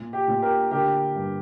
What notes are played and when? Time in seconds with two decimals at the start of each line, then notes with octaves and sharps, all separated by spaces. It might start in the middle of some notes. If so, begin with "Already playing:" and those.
Already playing: A#2
0.13 G4
0.28 A#2
0.42 G4 A#4
0.71 D3 G4 A#4
1.15 G2